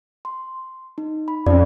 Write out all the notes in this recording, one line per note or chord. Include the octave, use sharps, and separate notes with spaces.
C6
D#4
B5
F2 C#4 D5